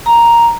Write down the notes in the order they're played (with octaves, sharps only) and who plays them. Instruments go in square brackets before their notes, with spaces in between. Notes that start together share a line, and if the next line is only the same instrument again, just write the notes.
[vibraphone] A#5